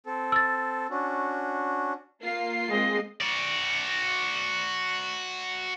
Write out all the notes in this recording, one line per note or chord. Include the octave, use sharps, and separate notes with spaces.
C4 A4
E6 A6
C#4 D4 F#4
A#3 F4 C7
G#3 C4 D#5
F#4 D5